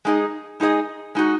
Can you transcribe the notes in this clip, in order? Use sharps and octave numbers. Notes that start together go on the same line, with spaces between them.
G#3 D#4 G#4 D#5
G#3 D#4 G#4 D#5
G#3 D#4 F#4